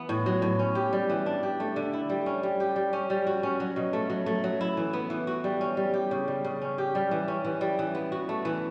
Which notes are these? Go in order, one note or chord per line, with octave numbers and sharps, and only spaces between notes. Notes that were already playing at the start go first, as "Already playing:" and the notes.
Already playing: E3 B3
A2
F#3
A2
C#4
G4
G3
E3
D4
G4
A3
D3
E4
G3
C#4
G3
G4
G3
C#4
G3
F#4
C#4
F#3
B2
A3
F#3
A3
F#3
E4
E3
B3
E3
F#4
G3
C#4
G3
G4
C#3
G3
C#3
C#4
G4
G3
E3
C#4
E3
G3
E3
B3
F#4
A3
E3